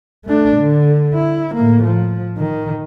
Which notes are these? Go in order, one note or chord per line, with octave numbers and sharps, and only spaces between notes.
A3 D4
D3
E4
A2 A#3
F3
D#3